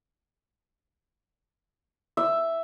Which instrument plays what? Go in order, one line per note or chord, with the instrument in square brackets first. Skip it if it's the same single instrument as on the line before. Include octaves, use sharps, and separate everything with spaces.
[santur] E5